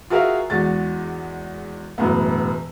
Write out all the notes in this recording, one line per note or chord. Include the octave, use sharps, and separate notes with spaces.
F4 F#4 G#4 A#4 E5 F5
E2 G#3 F#4 A6
E1 F#2 A2 B3